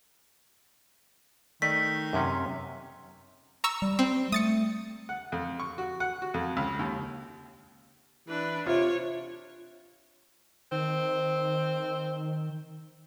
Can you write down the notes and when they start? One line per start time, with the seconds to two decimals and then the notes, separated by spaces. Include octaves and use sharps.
1.62 D#3 A3 D5 D#5 B6
2.13 F#2 C3 C#4
3.64 A#5 C#6 E6
3.82 G3
3.99 C4
4.32 A3 D#6 A6 C#7
5.09 F#5
5.32 F2
5.60 C#6
5.78 F#4
6.00 F#5
6.22 F#4
6.34 F2
6.57 C#2
6.79 D#2
8.28 E3 D4 B4
8.66 C3 F4 C#5
10.72 D#3 C4